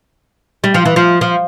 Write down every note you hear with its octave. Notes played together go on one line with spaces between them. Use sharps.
G3
F3
E3
F3
F3